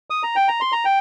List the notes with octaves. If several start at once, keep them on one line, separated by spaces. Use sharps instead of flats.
D#6
A#5
G5
A#5
C6
A#5
G5